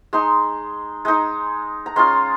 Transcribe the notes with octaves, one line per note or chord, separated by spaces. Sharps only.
G#3 D#4 C6
G#3 D#4
A#5
G#3 C#4 F4 C6